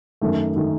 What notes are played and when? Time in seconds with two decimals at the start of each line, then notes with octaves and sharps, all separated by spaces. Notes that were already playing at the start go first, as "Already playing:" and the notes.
0.21 F#2 D#3 A3
0.56 D#3 A3